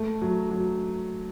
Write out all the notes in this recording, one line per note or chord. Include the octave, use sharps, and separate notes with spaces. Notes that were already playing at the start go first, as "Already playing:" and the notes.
Already playing: A3
F#3
F#3